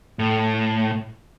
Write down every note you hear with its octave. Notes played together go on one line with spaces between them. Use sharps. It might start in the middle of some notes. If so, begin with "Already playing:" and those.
A2